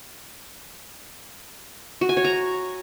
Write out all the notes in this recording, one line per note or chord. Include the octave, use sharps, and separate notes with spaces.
F#4
G#5
C#5
A#5